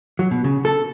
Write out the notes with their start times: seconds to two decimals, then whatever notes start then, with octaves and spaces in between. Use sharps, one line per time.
0.19 F#3
0.31 B2
0.44 C#3
0.65 A4